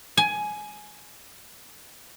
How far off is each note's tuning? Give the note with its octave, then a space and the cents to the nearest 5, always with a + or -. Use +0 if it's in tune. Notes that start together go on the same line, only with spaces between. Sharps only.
G#5 +15